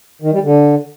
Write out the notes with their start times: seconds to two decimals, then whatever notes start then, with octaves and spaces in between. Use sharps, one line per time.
0.22 D#3
0.33 G3
0.43 D3